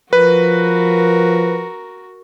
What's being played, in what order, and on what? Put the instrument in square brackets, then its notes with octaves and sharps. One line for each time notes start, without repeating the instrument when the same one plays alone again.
[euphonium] F3 [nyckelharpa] F#4 A#4 [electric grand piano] B4